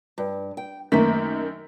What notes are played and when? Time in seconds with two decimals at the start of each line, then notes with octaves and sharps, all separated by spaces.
0.18 G2
0.57 G5
0.92 F#2 D#3 A3 A#3 B6